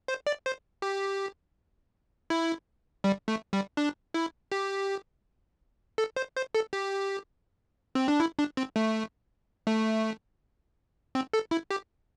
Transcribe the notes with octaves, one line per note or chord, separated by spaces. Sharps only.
C5
D5
C5
G4
E4
G3
A3
G3
D4
E4
G4
A4
C5
C5
A4
G4
C4
D4
E4
D4
C4
A3
A3
C4
A4
E4
G4